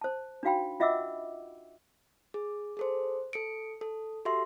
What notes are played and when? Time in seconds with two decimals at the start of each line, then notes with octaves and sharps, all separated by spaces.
0.01 C5 A5
0.43 D4 D#4 F#4 F5 G5 B5
0.80 F4 D#5 E5 F#5 D6 E6
2.34 G#4
2.77 G#4 A4 C5
3.33 A4 C#7 D7
3.81 A4
4.25 F#4 G4 A4 E5 C6